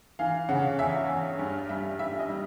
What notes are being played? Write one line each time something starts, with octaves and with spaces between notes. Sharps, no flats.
E3 F5
C#3 F#5
E2 E5
E2
G2
G3 E5
G3 E5
D#5
G3